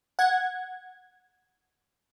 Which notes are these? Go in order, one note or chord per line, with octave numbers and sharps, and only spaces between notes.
F#5 G#6